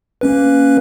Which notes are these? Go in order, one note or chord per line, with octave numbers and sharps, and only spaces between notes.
A#3 C#4 B4